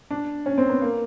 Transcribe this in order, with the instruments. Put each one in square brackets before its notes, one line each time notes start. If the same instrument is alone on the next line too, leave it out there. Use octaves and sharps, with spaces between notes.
[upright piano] D4
C#4
C4
B3
A#3